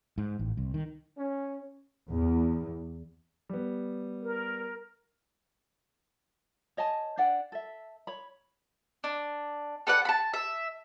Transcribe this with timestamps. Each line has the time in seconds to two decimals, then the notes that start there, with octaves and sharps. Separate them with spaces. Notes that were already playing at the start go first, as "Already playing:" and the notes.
0.18 G#2
0.39 A1
0.57 C2
0.74 D#3
1.18 C#4
2.11 E2
3.49 G3 B3
4.22 A#4
6.77 C#5 D#5 G#5 A5
7.17 D4 D5 F#5 G5
7.52 A4 E5
8.07 C#5 B5
9.04 D4
9.87 A4 B4 D5 F#5
10.05 A5 B5
10.34 E5